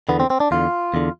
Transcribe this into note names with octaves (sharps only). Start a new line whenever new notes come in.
E2 D3 B3
C4
C4
D4
E2 D3 F4
E2 D3